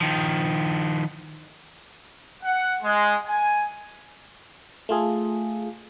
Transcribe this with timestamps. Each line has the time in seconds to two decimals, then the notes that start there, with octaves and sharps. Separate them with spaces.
0.01 D#3 F3
2.43 F#5
2.82 G#3
3.27 G#5
4.89 A3 F4 G#4 A4